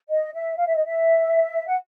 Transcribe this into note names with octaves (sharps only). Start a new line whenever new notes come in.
D#5
E5
F5
E5
D#5
E5
F#5